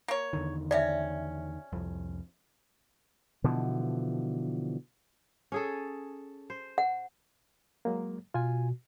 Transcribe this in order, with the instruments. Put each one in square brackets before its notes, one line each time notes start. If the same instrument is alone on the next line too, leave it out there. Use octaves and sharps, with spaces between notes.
[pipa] A#3 C#5
[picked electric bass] E2 D3 D#3
[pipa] C3 C#4 [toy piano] D5 E5
[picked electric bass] C2 F2
[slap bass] B2 D3 E3 F3
[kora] C#4 G#4 A4
C5
[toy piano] F#5
[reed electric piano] F#3 G#3 A#3
[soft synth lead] B2 [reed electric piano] F4 G#5